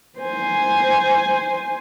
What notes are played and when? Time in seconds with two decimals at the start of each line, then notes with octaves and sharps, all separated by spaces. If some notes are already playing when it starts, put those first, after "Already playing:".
0.19 C5 G#5